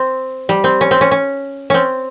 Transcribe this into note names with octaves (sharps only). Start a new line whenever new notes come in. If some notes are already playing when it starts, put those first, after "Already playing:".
Already playing: C4
G3
C4
C#4
C4
C#4
C#4
C4 C#4